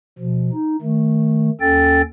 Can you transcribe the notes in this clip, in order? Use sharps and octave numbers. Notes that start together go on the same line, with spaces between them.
B2 F3
D#4
D#3 A3
D#2 C#4 A4 G5 A6